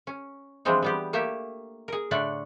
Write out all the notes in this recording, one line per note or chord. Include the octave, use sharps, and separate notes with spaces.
C#4
E3 F3 G3 G#3 C4 D4
G3 B3 G4
A3 A#3 G4 E5
G#4 A#4
A2 D3 A3 D4 F#5